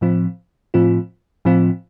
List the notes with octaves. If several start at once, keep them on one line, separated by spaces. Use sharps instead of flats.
A2 F3 C4 F4
A2 F3 C4 F4
A2 F3 C4 F4